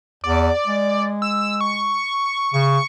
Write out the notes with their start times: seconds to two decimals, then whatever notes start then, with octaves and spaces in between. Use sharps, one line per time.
0.24 E2 D5
0.67 G#3
1.22 E6
1.61 C#6
2.54 C#3 C#6